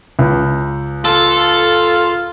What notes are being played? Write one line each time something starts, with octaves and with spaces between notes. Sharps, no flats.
C#2
F4 A4